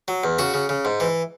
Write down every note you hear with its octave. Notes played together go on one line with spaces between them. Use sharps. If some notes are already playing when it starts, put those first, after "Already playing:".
F#3
E2
C#3 F#4
C#3
C#3
G#2
E3